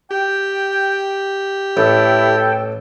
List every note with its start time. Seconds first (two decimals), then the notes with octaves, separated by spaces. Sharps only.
0.11 G4 G5
1.77 A1 E4 A4 G5